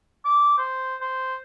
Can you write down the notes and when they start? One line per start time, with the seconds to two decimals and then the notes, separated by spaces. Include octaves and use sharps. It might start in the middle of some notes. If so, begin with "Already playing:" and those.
0.25 D6
0.58 C5
1.01 C5